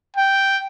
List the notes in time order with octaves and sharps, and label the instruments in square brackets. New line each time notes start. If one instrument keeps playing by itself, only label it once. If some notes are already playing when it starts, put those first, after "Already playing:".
[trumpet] G5